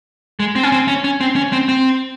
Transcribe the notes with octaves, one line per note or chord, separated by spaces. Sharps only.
G#3
C4
C#4
C4
C#4
C#4
C4
C#4
C4
C4